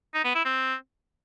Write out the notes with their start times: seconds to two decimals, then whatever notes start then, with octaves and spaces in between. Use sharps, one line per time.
0.14 D#4
0.25 B3
0.35 E4
0.45 C4